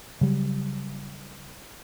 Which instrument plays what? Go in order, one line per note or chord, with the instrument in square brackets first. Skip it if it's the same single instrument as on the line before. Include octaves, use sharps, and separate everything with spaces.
[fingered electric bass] C#3 F#3 G3